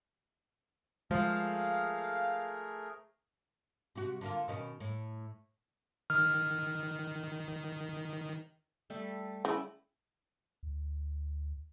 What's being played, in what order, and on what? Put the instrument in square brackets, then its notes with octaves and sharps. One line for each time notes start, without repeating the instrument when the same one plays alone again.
[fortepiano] F3 [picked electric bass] G#3 [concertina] A3 G#4 A#4 [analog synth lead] F5
[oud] C3 F#4
D3 A#3 F4
B2 D#3 C#4
A2
[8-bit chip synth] D#3 [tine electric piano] F6
[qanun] G3 A3 G4
[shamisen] C#3 [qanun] E4 D5
[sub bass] D2